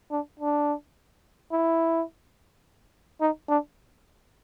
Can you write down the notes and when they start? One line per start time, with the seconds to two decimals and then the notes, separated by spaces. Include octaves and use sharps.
0.11 D4
0.39 D4
1.52 E4
3.21 D#4
3.49 D4